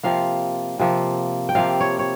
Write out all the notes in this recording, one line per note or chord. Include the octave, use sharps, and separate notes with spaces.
C3 F3 A#3 F5
C3 F3 A#3
G5
C3 F3 A#3 F5
C#5
C#5